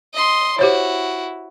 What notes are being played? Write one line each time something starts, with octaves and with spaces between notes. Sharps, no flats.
D#5 C6
E4 F#4 G4 C5 C#5